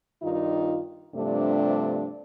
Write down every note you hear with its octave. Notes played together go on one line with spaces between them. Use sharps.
G2 D#3 D#4 F4
G2 C3 F3 A3 D4